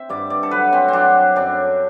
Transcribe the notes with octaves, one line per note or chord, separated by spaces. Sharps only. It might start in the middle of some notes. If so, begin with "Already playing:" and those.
Already playing: C4 C5 E5
G2 D5
D5
A4
F#3 B4
C4
C4
F#3 D4
F#2 D4